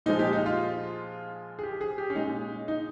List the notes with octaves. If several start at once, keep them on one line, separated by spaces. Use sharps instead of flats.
A#2 F3 G#3 D#4
G4
D#4
F4
G#4
G4
G#4
G4
C#4
A#2 G#3 D#4
D#4